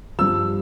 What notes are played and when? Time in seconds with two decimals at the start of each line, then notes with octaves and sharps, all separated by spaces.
0.19 G2 F3 E6